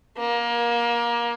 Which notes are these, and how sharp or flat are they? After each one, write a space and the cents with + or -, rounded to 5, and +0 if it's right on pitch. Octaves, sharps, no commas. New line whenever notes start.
A#3 +25